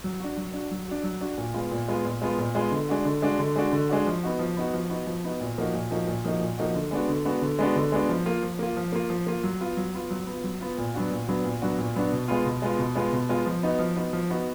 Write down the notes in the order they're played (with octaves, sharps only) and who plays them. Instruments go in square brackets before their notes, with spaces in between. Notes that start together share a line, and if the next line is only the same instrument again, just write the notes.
[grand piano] F#3
D4 F#4
F#3
D4 F#4
F#3
D4 F#4
F#3
D4 F#4
A#2
G#3 B3 F4
A#2
G#3 B3 F4
A#2
G#3 B3 F4
A#2
G#3 B3 F4
D3
G#3 D4 F#4
D3
G#3 D4 F#4
D3
G#3 D4 F#4
D3
G#3 D4 F#4
F3
B3 D#4 F#4
F3
B3 D#4 F#4
F3
B3 D#4 F#4
F3
B3 D#4 F#4
A#2
F3 A#3 D#4 F#4
A#2
F3 A#3 D#4 F#4
A#2
F3 A#3 D#4 F#4
A#2
F3 A#3 D#4 F#4
D3
G#3 B3 D4 F#4
D3
G#3 B3 D4 F#4
D3
G#3 B3 D4 F#4
D3
G#3 B3 D4 F#4
F3
A#3 F4
F3
A#3 F4
F3
A#3 F4
F3
A#3 F4
F#3
B3 F4
F#3
B3 F4
F#3
B3
F4
F#3
B3 F4
A#2
F#3 B3 D4 F#4
A#2
F#3 B3 D4 F#4
A#2
F#3 B3 D4 F#4
A#2
F#3 B3 D4 F#4
B2
G#3 B3 F4
B2
G#3 B3 F4
B2
G#3 B3 F4
B2
G#3 B3 F4
F3
B3 D#4 F#4
F3
B3 D#4 F#4
F3
B3 D#4 F#4